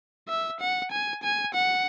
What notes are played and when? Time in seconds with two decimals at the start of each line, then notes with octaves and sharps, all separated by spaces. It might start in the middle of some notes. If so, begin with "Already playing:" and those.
0.28 E5
0.60 F#5
0.92 G#5
1.23 G#5
1.54 F#5